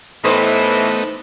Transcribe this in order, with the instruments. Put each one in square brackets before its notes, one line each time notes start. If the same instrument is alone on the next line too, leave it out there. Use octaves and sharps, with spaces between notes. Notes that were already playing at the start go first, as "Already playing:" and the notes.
[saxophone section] A2 E3 [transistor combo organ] A3 B3 D#4 [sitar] B4 C5 D#5